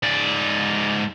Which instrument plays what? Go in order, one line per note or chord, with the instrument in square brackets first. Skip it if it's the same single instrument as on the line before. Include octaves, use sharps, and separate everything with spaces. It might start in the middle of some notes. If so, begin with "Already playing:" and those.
[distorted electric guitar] G#2 D5